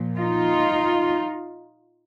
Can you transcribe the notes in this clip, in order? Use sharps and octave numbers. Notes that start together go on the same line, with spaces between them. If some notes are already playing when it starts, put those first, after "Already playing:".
Already playing: A#2 F3
D#4 F4